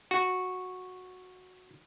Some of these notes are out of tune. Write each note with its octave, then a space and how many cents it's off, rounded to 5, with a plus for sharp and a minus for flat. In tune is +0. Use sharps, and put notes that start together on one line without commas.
F#4 -10